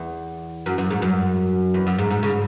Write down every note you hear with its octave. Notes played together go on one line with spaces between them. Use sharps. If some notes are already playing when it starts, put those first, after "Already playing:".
Already playing: E2
F#2
F#2
G#2
F#2
E2
F#2
G#2
G#2
C#3